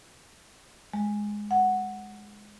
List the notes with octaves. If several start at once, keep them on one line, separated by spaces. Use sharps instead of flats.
G#3
F#5